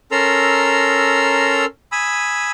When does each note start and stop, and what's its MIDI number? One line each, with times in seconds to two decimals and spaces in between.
0.12 1.65 61
0.12 1.65 69
0.12 1.65 70
0.12 1.65 82
0.12 1.65 84
0.12 1.65 88
1.92 2.51 80
1.92 2.51 83
1.92 2.51 87
1.92 2.51 88